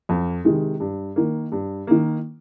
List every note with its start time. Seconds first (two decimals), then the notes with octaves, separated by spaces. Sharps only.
0.09 F2
0.45 C3 D#3 G#3
0.80 G2
1.16 D#3 A#3
1.52 G2
1.87 D#3 A#3